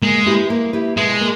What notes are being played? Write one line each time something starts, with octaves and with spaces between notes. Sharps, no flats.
G#3 A#3
E4 G4 B4
A#3
E4 G4 B4
B2 G#3
A#3